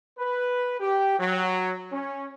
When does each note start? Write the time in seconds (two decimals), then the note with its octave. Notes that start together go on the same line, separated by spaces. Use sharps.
0.19 B4
0.80 G4
1.19 F#3
1.91 C#4